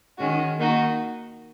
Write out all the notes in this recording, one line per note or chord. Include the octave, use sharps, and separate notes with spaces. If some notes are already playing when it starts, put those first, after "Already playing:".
D#3 G#3 C#4 F#4
D#3 A#3 D#4 F#4